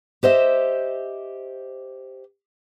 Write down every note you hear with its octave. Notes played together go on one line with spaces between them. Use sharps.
G4 C5 D#5 E5